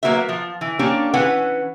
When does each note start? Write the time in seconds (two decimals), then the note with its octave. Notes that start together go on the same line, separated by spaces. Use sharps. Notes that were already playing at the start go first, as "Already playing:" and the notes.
0.03 F#3 G#3 A#3 F#4 B4 E5
0.29 F3
0.61 E3
0.79 A#3 C#4 D4 G4 C#5
1.14 E3 C#4 B4 F#5